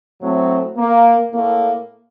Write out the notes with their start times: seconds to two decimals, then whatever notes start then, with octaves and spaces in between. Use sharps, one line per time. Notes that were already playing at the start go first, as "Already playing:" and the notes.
0.22 A2 F#3 A3 C4
0.77 A#3
1.32 A2 A3 A#3